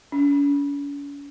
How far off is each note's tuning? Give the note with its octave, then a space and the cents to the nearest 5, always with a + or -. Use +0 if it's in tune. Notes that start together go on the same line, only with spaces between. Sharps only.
C#4 +45